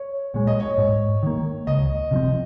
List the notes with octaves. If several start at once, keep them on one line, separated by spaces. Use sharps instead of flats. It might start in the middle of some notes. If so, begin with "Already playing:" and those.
Already playing: C#5
A#2 G#3 C#5
D#5
C#5
G#2
D#3 A#3
C#2 D#5
C3 F3 C4